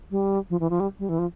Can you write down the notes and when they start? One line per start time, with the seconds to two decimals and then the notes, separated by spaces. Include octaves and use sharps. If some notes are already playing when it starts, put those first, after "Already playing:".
0.11 G3
0.50 F3
0.60 E3
0.70 F3
0.80 G3
0.99 G3
1.09 E3
1.19 F3